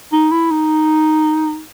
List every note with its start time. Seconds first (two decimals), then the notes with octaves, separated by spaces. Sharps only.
0.12 D#4
0.31 E4
0.51 D#4